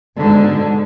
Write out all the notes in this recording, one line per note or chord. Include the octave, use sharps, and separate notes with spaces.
G#2 B2 D3